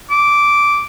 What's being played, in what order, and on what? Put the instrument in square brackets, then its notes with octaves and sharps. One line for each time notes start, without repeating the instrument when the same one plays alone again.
[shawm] D6